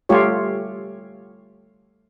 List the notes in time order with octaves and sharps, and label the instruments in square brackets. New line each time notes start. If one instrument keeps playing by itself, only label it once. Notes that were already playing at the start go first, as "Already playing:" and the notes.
[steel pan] G3 A3 F4 G4 C#5